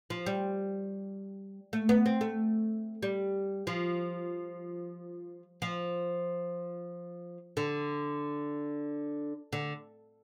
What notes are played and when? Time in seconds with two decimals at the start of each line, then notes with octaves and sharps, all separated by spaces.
0.10 F3
0.26 G3
1.73 A3
1.89 B3
2.06 C4
2.21 A3
3.03 G3
3.67 F3
5.62 F3
7.57 D3
9.53 D3